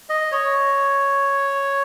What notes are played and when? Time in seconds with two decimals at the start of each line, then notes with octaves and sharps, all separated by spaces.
0.09 D#5
0.32 C#5